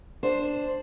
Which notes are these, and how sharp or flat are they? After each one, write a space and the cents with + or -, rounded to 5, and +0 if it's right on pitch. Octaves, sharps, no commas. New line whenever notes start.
D4 +0 C5 +0